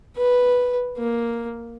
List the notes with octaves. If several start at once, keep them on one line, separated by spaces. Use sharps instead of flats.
B4
A#3